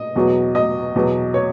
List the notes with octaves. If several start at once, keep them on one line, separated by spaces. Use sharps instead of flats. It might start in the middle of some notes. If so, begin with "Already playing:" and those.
Already playing: D#5
E2 B2 F#3
D#5
E2 B2 F#3
C#5